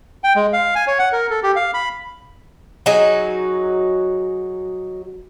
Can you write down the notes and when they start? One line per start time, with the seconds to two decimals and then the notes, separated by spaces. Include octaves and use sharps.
0.24 G5
0.36 G#3
0.53 F5
0.75 G#5
0.87 C#5
0.99 F#5
1.12 A#4
1.30 A4
1.43 G4
1.56 F5
1.74 B5
2.86 F#3 D#4 F#4 G#4